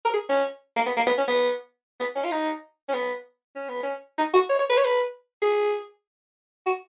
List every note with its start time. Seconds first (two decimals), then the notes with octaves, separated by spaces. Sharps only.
0.05 A#4
0.14 G#4
0.29 C#4
0.76 A#3
0.86 B3
0.97 A#3
1.07 B3
1.18 C#4
1.28 B3
2.00 B3
2.16 C#4
2.24 F4
2.32 D#4
2.88 C#4
2.94 B3
3.55 C#4
3.69 B3
3.83 C#4
4.18 D#4
4.34 F#4
4.49 C#5
4.59 C#5
4.70 B4
4.77 C#5
4.84 B4
5.42 G#4
6.66 F#4